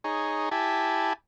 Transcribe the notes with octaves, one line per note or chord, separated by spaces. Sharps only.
D#4 G#4 C#5
E4 G4 G#5 A5 B5